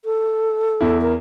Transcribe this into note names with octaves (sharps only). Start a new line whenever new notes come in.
A4
E2 E4
A#4